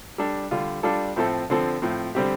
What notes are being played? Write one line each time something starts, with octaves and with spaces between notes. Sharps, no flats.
G3 D4 A4
D3 G3 F4
G3 D4 F4 A4
A2 F3 A3 C4 A4
D3 F3 C4 A4
A2 F3 C4
D3 G3 C4 G4